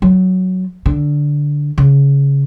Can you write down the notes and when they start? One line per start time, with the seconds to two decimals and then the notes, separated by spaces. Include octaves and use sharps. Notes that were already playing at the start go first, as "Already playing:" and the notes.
0.02 F#3
0.86 D3
1.78 C#3